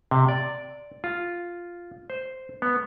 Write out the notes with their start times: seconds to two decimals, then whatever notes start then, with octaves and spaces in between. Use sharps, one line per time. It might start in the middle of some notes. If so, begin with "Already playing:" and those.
0.11 C3
0.29 D5
1.04 F4
2.10 C5
2.62 B3